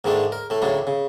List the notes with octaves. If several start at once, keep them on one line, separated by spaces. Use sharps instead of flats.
G#2 D#3 G#3 A3 D4
A#4
A2 A3
D2 A2 C#3 F#3 D4
C#3